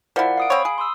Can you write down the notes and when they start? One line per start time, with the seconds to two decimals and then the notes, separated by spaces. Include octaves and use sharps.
0.16 F3 E4 A#4 D5 F#5
0.37 F5 D#6 D7
0.50 C4 C#5 B5
0.65 G#4
0.78 C6 D#6 E6